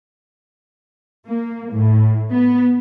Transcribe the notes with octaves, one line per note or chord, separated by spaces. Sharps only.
A#3
A2
B3